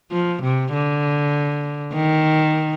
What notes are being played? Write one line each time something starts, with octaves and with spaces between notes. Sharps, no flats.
F3
C3
D3
D#3